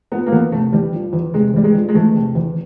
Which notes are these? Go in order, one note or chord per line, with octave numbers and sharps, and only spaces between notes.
F3 B3
A#3
E2 B3
C3 A3
E2 G3
F3
E2
C3 G#3
E2 G3
G#3
F3
G#3
E2 A3
C3
E2